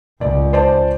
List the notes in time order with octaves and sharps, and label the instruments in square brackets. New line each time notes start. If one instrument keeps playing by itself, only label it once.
[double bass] C#2 [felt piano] D5
[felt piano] C5 D5 A5